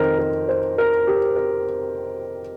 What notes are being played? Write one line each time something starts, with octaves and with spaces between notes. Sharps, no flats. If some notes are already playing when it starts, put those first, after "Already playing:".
Already playing: F2 D#3 A#4 C5
A#4
C5
A#4
G4
A#4